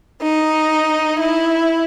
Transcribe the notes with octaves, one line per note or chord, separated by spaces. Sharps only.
D#4
E4